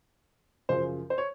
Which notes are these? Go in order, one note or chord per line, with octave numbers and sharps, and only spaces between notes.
F#2 C#3 F3 C5
C5
C#5